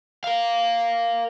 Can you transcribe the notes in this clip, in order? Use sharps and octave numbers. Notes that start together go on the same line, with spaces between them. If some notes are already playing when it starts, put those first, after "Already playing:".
A#4 F5